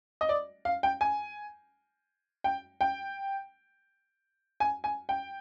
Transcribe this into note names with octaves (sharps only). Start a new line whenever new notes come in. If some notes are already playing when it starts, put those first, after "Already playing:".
D#5
D5
F5
G5
G#5
G5
G5
G#5
G#5
G5